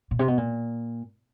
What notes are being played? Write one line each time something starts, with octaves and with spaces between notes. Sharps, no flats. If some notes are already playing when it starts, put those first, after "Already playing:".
A#2
C3
B2
A#2